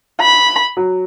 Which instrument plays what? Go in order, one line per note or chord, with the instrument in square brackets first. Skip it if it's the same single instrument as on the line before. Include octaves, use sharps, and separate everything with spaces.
[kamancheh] B5
[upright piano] F#3